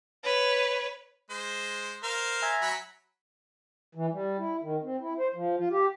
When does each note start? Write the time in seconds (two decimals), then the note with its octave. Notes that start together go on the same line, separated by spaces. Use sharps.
0.24 B4 C#5
1.30 G#3 C5
2.03 A#4 C5 F5
2.42 E5 G#5 A#5
2.62 F#3 B5
3.95 E3
4.12 G3
4.38 E4
4.62 D#3
4.83 C4
5.01 E4
5.19 C5
5.34 F3
5.57 F4
5.71 G4